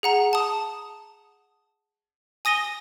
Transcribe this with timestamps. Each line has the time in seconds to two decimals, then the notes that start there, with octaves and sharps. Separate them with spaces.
0.03 G#4 F#5 A#5
0.33 A5 D#6
2.45 G#5 D#6 A#6 D#7 G7